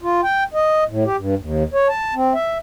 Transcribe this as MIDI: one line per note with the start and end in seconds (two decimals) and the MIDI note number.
0.02 0.21 65
0.23 0.44 79
0.54 0.84 75
0.89 1.04 45
1.05 1.16 67
1.17 1.35 43
1.39 1.63 39
1.74 1.88 73
1.89 2.14 81
2.15 2.33 60
2.34 2.58 76